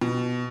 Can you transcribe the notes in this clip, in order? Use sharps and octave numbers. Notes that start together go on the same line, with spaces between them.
B2